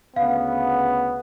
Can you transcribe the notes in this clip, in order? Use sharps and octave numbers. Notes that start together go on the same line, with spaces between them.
D2 C#3 B3 F5